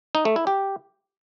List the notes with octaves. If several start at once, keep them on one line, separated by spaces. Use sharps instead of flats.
D#4
A3
E4
G4